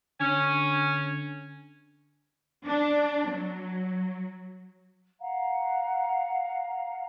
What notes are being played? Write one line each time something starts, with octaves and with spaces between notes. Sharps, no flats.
D3 C#4
D4
F#3
F5 F#5 A#5